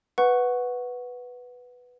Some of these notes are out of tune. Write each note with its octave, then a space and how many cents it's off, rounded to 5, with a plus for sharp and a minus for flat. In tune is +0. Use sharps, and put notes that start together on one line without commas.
B4 +0 F#5 -10 C#6 +0